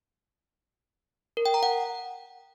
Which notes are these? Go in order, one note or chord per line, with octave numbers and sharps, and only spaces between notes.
A#4
G5
A#5
F#5